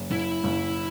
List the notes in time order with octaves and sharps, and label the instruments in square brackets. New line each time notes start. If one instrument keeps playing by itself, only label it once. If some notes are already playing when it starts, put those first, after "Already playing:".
Already playing: [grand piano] F#1
[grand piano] F#1 [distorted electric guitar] E4
[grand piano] F#1